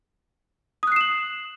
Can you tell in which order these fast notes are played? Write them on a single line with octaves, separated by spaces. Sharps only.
D#6 F#6 C7 E7 F#7